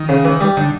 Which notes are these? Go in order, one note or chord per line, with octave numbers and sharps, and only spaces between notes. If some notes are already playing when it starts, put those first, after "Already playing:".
Already playing: D#3
C#3
E3
G3
D3 D#4